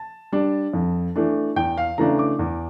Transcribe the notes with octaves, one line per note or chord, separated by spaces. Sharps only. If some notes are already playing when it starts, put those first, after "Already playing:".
Already playing: A5
G3 D4
F2
E3 A3 D4
E2 G5
F5
C#3 E3 A3 D4 A#5
D6
E2